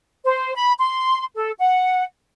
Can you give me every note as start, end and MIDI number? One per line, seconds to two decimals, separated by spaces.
0.25 0.53 72
0.55 0.73 83
0.79 1.22 84
1.35 1.51 69
1.59 2.03 78